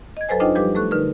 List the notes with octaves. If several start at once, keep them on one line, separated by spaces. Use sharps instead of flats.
D#5 G#6
F#2 F#3 A4 B4 C5 G#5
D4 D#4 F4 C5 D#5 G5
F3 G3 G4 B4 D6
A3 A4 C#6 F#6
D3 D#4 A#4 B4